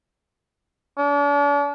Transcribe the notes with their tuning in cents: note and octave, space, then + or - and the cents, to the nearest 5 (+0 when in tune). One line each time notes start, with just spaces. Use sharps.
D4 -40